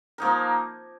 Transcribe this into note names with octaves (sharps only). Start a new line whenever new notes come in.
F3 A#3 D#4 A#4